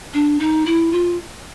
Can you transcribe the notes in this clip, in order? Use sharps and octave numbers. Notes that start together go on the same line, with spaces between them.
D4
D#4
E4
F4